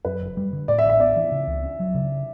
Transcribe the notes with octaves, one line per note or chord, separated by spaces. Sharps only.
F#2 B4
F#1
G3
D3
A2 D5
E5
A1
E5
B3 D5
E3
C#3
C#2
C#4
F#3
C#3